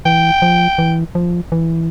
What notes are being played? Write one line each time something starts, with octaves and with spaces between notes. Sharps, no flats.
E3 G5
F3
E3
F3
E3